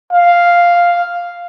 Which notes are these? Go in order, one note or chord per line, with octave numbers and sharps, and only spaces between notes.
F5